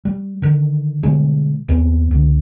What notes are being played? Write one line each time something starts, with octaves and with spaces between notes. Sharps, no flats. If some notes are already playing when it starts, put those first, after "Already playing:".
G3
D3 D#3
B2 D3 G3 G#3
D#2 B3 C4
C#2 D3